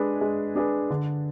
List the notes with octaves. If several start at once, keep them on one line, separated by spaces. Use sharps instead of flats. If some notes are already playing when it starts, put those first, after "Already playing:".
Already playing: G#3 D4 G#4 B4
G#3
D4 G#4 B4
D3